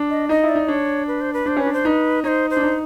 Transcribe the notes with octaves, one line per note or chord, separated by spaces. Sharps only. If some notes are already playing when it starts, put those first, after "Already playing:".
Already playing: D4
D#5
D#4 D#5
E4
D5
D#4
D4 C#5
B4
C5
B4
D4 C5
C#4 B4
D4
C5
D#4 B4
D#4 C5 C#5
C5
D4
D#4